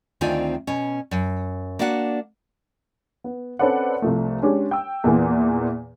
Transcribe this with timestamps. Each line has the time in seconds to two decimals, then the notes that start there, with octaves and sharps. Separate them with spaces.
0.21 D2 D#3 C4 D4 F4 G#5
0.67 B2 C#4
1.11 F#2
1.79 A#3 D4 F#4 F5 F#5
3.24 B3
3.59 C4 C#4 A4 B4 D5 F#5
4.02 C2 F3 A3
4.42 G#3 C#4 D4 G4
4.71 G5 E6
5.04 E2 A#2 E3